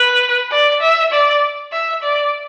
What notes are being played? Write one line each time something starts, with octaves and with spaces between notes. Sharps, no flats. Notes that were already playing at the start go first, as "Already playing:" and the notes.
Already playing: B4
D5
E5
D5
E5
D5